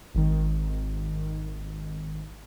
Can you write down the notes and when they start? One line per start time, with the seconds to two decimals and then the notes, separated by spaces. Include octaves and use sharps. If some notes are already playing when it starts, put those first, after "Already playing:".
0.15 G#1 D#3